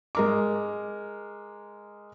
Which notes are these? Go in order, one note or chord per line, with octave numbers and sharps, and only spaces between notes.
G#3 A#4 D6